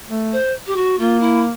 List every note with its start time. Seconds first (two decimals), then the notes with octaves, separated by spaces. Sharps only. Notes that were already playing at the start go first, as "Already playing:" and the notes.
0.10 A3
0.32 C5
0.66 G4
0.76 F#4
0.99 A#3 F4
1.20 E4